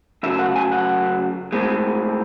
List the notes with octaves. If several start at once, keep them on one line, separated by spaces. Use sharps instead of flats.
F#2 C#3 F#3 A3 E5
F#5
G#5
F#5
A2 G#3 C4